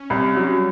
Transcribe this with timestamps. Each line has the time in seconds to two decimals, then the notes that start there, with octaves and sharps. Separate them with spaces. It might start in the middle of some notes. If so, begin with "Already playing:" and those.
Already playing: C#4
0.10 C2 G3
0.36 F#3